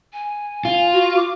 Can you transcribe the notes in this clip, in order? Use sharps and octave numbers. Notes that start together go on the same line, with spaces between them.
G#5
F4
F#4
D6